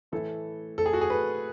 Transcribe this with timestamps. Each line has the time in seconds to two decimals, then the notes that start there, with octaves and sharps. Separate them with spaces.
0.12 A2 E3 A3 E4 A4
0.78 A4
0.86 G#4
0.93 F#4
1.01 G#4
1.10 B4